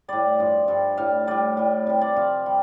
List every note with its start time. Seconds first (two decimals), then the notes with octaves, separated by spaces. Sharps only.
0.08 A2 G3 D5
0.39 G2 F3
0.68 G2 G3
0.97 A2 G3 F5
1.27 A2 G3 D5
1.57 A2 G3
1.87 C3 G3
2.01 D5
2.16 C3 F3 F5
2.46 G3